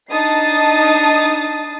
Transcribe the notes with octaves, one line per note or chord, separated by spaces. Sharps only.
D4 D#4 A5 D#6 A6 C7